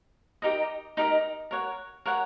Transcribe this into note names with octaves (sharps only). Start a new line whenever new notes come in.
D#4 G4 A#4 D#5
D#4 G4 A#4 D#5
A#4 C#5 F#5
A#4 C#5 F#5